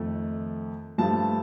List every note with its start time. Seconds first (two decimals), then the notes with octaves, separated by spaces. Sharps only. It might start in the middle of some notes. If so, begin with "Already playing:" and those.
Already playing: F2 D#3 A3
0.98 G2 F3 A3 A5